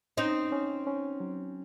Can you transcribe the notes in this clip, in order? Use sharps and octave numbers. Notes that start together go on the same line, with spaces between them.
C4 C#4 D#4
C#4
C#4
F#3